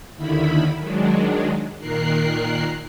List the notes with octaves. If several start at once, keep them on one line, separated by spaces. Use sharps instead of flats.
D#2 D3 D#3 E4 B5
D#3 F#3 G#3 D4
A#2 D#3 A#4 F#6 C7